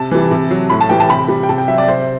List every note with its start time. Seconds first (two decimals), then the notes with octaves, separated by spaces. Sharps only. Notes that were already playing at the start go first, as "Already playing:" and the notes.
Already playing: C3 A5
0.11 E3 G3
0.31 C3
0.51 F#3
0.70 A2 B5
0.81 A5
0.89 E3 G3 G5
1.00 A5
1.09 C3 B5
1.28 G3
1.43 G5
1.49 C3 A5
1.58 G5
1.68 F#3 E5
1.78 D5
1.88 C3 C5